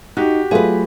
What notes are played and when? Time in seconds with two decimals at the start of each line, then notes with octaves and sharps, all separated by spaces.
0.17 D#4 F#4 G4
0.51 F#3 A3 F4 G#4 B4